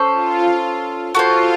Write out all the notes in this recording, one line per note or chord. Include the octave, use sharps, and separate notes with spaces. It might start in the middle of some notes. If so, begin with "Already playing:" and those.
Already playing: C#4 A4 C5
F4
F4 F#4 A4 C5